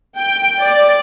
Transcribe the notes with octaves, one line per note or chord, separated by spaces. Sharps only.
G5
D5